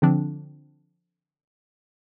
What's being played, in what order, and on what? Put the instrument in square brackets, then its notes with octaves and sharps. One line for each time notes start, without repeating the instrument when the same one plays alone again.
[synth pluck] D3 F3 C4 D4